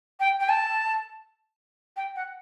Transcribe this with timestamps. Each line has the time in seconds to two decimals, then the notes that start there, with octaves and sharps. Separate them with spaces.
0.19 G5
0.40 G5
0.49 A5
1.96 G5
2.15 F#5